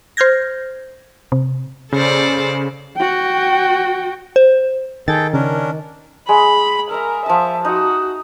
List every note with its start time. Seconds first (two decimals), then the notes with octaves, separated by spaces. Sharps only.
0.17 C5 F6 G6 G#6 A#6
1.32 C3
1.92 C#3 A4 C5 D5
2.97 F#4 G5
4.36 C5
5.08 D#3 G#4 A4 G5 A6
5.33 C#3 C#4 D4 A#4
6.29 G#3 B5
6.91 A#4 E5 A#5
7.26 F3 E5 A5
7.65 D#4 F#4